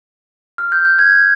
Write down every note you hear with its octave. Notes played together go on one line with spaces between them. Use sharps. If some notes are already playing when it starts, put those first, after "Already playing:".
F6
G6
G6
G#6